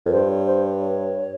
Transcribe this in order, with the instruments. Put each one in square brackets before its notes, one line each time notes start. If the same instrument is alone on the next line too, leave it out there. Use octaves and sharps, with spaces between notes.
[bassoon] F2 [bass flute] A#4
[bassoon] G2 [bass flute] C5
[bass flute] C#5
C5
C#5